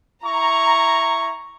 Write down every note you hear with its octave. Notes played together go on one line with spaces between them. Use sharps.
E4 A#5 C#6